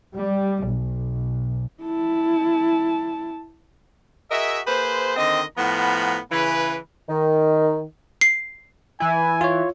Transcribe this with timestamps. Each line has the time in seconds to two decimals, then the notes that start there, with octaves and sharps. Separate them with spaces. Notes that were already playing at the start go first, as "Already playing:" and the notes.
0.15 G3
0.66 B1
1.82 E4 A5
4.30 F#4 G#4 A#4 D#5 E5
4.66 A#3 G#4 B4 C5
5.16 D3 D#3 C4 D#5
5.57 A2 F3 B3 F#5 A#5 B5
6.31 C#3 E3 B4
7.09 D#3
8.21 C7
9.00 E3 E4 G#5
9.41 F4 C#5